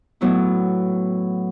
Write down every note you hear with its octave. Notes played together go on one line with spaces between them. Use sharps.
A2 F#3 B3 E4